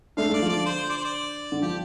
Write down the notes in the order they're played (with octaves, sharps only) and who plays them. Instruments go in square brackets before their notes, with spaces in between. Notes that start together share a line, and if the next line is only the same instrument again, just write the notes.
[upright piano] A3 D4 [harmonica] F5
[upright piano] A3 D4 [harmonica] D5
[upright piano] F3
[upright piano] D3 [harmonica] D5
[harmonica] C5
D5
C5
D5
[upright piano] D3
[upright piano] F3 [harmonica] G4